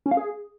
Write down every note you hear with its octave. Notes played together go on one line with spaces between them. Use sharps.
C#4
F5
G#4